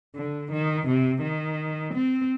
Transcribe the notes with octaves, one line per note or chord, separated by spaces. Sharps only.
D3
D#3
C3
D#3
C4